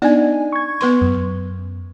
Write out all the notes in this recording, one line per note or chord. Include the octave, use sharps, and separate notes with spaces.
B3 D4 D#4 D5 G#5
C#6 G#6
B3 B4 C6
F#2